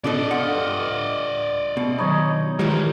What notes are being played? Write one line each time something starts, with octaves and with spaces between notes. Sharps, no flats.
B2 D4 A4 D5 D#5
F4 A4 F#5
G2
B2
D#3 F#3 D#4 C#5 B5
D#3 E3 G3 G#3 A#4 C5